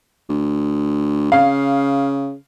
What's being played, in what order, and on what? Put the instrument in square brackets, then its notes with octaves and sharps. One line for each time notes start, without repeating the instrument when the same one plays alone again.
[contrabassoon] D2
[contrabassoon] C#3 [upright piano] F5